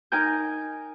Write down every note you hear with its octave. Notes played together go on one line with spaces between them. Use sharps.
D#4 A#4 G5 G#5 G6